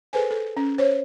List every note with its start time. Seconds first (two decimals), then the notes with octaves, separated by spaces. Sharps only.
0.13 G#4 A4 B4 C5 G#5
0.31 A4
0.57 C#4
0.78 C5 C#5